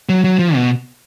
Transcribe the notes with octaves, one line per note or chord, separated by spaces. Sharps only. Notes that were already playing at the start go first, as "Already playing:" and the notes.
F#3
F#3
F3
B2